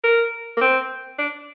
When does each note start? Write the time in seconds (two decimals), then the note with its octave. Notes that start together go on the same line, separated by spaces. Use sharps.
0.04 A#4
0.57 A#3
0.61 C4
1.18 D4